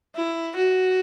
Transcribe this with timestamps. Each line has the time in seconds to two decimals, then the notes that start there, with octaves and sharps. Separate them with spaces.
0.16 E4
0.56 F#4